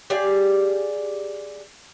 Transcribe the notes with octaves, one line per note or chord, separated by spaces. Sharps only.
G4 G#4 D5 F5